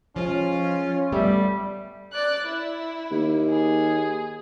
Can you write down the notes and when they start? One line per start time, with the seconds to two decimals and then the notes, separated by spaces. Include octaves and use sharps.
0.16 F3 G#3 C#4 F4
1.12 G3 A3 B3 G4 E5
2.12 D5 F#6
2.45 E4
3.11 D#2
3.49 G#4